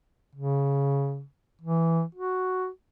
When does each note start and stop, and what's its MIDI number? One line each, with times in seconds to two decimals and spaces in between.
0.35 1.23 49
1.62 2.03 52
2.15 2.68 66